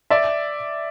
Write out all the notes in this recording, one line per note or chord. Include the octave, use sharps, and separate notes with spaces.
D5 E5